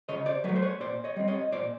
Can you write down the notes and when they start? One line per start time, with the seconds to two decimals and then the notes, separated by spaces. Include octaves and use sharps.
0.09 C#3 C#5 D#5
0.26 C5 D5
0.44 F#3 B4 C#5
0.49 A3
0.56 C5
0.62 B4 C#5
0.80 A#2 C5 D5
1.04 C#5 D#5
1.16 G3 C4
1.28 C#5 D#5
1.52 A#2 C5 D5